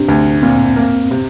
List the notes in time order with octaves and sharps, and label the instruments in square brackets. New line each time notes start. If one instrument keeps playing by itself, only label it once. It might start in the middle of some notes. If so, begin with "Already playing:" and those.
Already playing: [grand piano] C3 [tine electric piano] D4
[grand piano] D2
[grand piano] A#2 [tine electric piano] C4
[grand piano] A#3
C3